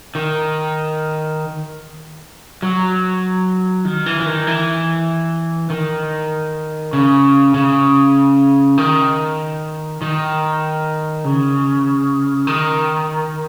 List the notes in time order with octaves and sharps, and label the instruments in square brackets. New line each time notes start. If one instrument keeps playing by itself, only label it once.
[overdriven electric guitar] D#3
F#3
D#3
E3
E3
D#3
E3
D#3
C#3
C#3
D#3
D#3
C#3
D#3